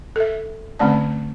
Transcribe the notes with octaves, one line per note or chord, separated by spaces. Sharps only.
A4 E5
D3 A3 C4 C#4 D5 A5